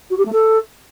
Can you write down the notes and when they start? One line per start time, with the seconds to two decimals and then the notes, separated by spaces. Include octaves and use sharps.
0.10 F#4
0.17 G4
0.25 A3
0.32 A4